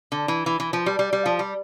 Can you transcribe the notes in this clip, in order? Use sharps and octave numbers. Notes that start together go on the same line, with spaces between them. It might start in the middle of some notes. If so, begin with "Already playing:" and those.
D3
E3
E3
E3
F3
G3
G3
G3
F3
G3